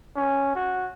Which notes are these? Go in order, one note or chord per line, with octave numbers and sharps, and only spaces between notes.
C#4
F#4